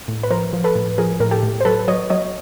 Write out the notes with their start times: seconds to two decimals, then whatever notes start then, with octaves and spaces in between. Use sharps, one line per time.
0.08 A2
0.23 B4
0.30 F3 A#4 C5
0.53 F3
0.64 A4 B4
0.75 A2
0.98 F3 G#4 A#4
1.20 A2 A#4
1.31 G4 A4
1.43 A2
1.61 C5
1.65 F#3 A4 B4
1.88 F#3 C#5 D#5
2.10 F#3 C#5 D#5